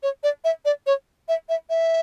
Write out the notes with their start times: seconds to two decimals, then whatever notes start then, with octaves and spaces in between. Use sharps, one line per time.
0.03 C#5
0.23 D5
0.44 E5
0.65 D5
0.86 C#5
1.28 E5
1.49 E5
1.70 E5